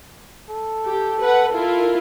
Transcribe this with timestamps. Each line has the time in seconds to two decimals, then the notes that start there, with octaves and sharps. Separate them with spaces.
0.50 A4
0.85 G4
1.19 B4 F#5
1.54 E4 F4 A#4